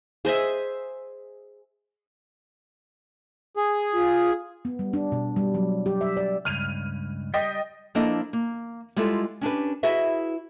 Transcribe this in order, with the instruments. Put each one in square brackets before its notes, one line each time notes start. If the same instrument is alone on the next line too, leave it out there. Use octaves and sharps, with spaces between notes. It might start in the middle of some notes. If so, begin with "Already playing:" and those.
[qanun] G#4 C5 D#5 E5
[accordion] G#4
[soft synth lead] F4
[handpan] B3
G3
D4
B2
G3
F#3
G4
E5
D5
[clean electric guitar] C#2 G2 [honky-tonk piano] F6 D#7 F7
[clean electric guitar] G3 [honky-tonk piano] D#5 G5
[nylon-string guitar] F3 A#3 D4 E4 A4 D#5
A#3
G3 G#3 E4 F4 A4
C#4 D4 G4 B4
E4 F#4 G#4 B4 D#5 E5